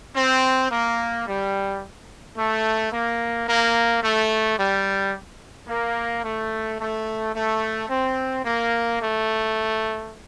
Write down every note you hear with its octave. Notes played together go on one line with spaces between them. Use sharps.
C4
A#3
G3
A3
A#3
A#3
A3
G3
A#3
A3
A3
A3
C4
A#3
A3